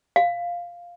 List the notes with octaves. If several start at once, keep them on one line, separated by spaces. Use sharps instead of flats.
F5